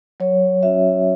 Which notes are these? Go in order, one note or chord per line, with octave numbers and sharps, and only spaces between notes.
F#3 C#5
C#4 F#4 E5